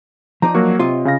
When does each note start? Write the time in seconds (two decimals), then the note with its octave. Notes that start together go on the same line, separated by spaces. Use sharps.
0.42 F3 D#4 D5 A#5
0.55 F#3 A#3 F#4
0.79 C3 F4 C#5 D#5
1.05 C#3 F5 A#6